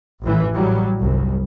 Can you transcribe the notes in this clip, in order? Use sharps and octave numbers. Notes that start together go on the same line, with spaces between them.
A1 E3
A2 F#3 G3
G1 C2